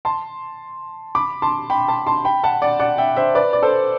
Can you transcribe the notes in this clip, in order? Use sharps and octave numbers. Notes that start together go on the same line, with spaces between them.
A5 C6
B5 D6
A5 C6
G5 B5
A5 C6
A5 C6
G5 B5
F#5 A5
D5 F#5
D5 F#5
E5 G5
C5 E5
B4 D5
D5
A4 C5